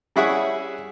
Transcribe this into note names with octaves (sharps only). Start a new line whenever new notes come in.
G3 C#4 E4 G#4 E5 F#5